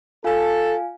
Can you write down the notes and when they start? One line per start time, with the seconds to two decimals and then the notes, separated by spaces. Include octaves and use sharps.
0.24 F4 A4 F5 G#5